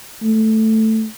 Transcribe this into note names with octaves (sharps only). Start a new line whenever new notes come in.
A3